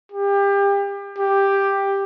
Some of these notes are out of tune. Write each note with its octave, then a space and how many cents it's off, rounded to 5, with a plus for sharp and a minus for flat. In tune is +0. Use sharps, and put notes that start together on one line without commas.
G4 +30
G4 +5